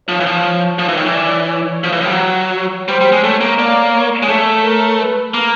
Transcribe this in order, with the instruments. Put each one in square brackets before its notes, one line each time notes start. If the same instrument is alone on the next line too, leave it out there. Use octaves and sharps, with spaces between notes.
[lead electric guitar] F3 [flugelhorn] C#5
[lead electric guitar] E3
F3
[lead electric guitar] F3 [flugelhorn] C#5
[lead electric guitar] E3
D#3
E3
[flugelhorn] D5
C#5
[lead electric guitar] F3
E3
F3
G3
F#3
[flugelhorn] C#5
[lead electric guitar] G3 [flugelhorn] C5
[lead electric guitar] G3
G#3
[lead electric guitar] A3 [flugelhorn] C#5
[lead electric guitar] A#3
[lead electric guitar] A#3 [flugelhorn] D5
[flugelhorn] C#5
[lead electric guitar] G#3
[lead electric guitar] A3 [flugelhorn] C#5
[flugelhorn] A#4
B4
[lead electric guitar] A#3